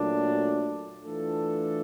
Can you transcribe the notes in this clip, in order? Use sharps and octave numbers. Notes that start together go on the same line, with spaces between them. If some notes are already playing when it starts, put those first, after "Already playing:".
Already playing: A#2 F#3 A3 D4
E3 A3 D4 F4 A4